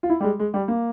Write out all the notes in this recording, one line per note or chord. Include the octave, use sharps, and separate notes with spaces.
F4
E4
G3
G#3
G#3
G3
A#3